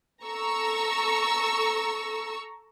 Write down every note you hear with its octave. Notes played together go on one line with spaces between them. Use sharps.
A4 A#5 C#6 E6